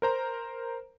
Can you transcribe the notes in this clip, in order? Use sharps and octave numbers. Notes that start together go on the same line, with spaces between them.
A#4 C5 A#5